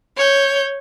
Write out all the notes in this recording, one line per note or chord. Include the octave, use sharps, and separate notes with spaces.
C#5 G6